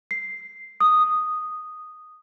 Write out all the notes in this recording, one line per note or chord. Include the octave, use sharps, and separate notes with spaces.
C7
D#6